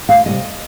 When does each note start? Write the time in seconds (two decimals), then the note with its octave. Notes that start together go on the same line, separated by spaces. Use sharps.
0.09 D2 F5
0.26 C3 D#3 G3 D#5